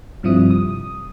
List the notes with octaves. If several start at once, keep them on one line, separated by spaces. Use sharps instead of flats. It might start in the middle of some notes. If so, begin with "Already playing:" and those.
G2 C3 F3 G3 E4 D#6
D#6